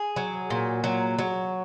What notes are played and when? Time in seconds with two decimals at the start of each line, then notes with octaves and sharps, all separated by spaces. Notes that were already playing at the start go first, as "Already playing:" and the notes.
Already playing: G#4
0.16 F#3
0.50 A#2
0.84 F#3
1.19 F#3